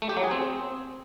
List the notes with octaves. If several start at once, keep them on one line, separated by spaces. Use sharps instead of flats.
A3
G4
F#3
G#4
C4